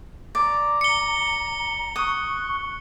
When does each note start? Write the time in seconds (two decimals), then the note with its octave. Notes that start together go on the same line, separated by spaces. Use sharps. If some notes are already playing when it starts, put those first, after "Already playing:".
0.35 D5 A#5
0.81 C#7 G7
1.96 C#6 D#6 F#6